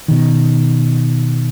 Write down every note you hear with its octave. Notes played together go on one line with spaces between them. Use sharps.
B2 D#3